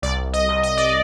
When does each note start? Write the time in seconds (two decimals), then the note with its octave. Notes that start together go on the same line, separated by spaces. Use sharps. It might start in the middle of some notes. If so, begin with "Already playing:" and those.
0.02 C2 D5
0.33 D#5
0.49 C2
0.63 D#5
0.77 D5